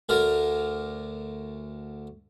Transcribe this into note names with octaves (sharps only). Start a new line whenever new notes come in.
D2 D3 A#4